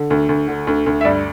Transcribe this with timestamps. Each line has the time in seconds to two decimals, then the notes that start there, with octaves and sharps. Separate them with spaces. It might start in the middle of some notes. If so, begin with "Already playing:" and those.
Already playing: D3
0.10 D2
0.29 D2
0.48 D3
0.67 D2
0.86 D2
1.01 E5
1.05 G2 D5